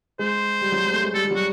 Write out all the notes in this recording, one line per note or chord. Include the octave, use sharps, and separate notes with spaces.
G#3 C5
G3
F#3
G#3
A3
G#3
G3 A4
G3
F#3
G3 F#4